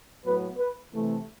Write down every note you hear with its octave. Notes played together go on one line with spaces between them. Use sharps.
A2 F#3 B3 B4
B4
C3 E3 A3